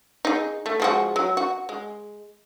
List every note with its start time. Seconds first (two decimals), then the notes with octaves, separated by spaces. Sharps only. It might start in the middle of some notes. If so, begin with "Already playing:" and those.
0.25 D#4 G#4
0.66 A3
0.80 F3 G#3 F#4
1.16 F#3
1.37 F#4
1.69 G#3